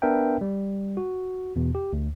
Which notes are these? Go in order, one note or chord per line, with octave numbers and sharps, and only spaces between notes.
B3 D4 A#4 B4 E5 G5
G3
F#4
E2 B2
G4
D2